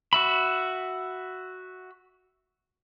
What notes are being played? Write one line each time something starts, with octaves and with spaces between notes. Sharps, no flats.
F#4 E5 B5